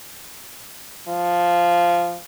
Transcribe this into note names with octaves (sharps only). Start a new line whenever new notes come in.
F3